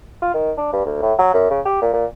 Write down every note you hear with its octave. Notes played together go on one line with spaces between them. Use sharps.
F4
D#3
D4
G2
D2
A2
F#3
F#2
C#3
G4
A#2
A#2